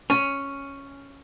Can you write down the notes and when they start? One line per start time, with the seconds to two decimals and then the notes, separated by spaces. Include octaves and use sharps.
0.10 C#4